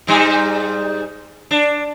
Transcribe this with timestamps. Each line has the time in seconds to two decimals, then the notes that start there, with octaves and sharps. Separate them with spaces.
0.07 G#2 G3 D#4
1.51 D4